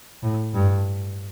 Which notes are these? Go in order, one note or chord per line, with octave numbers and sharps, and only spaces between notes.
A2
G2